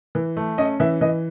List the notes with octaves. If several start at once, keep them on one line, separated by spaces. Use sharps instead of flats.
E3
A3
C#4 D#5
E3 E5
E3 D#5